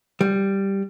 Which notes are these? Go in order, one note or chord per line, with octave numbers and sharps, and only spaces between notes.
G3